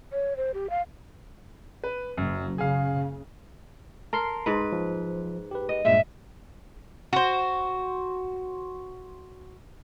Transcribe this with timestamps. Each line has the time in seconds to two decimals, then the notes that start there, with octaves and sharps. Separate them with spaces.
0.12 C#5
0.37 C5
0.54 G4
0.70 F5
1.84 B4
2.18 F#1 F#2
2.58 C#3 G#4 F5
4.13 A#4 A5 C6 C7
4.46 G#2 B4
4.72 F3
5.51 G4 B4
5.69 D#5
5.85 G2 A#2 G#3 E5
7.13 F#4 C5